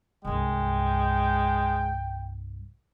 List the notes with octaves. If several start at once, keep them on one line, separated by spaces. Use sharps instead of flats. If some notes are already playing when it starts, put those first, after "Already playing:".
C2 G2 G#3 G5